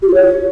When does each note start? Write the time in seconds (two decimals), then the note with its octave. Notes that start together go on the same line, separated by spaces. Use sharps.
0.02 G4
0.08 F4
0.14 C#5